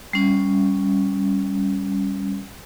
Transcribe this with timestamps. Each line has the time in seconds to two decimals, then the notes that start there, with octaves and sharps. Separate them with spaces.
0.13 G3 C#4